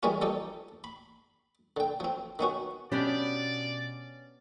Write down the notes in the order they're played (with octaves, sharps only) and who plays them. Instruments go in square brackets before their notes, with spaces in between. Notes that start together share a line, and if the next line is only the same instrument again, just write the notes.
[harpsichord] E3 G3 G#3 A#3 C#4 F4
F3 G3 D#4 G4 A4
B5
D3 G5
F3 C4
D#3 B3 C#4 F#4
[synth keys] B2 [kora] B3 D4 G4 [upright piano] C#4 [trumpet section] D5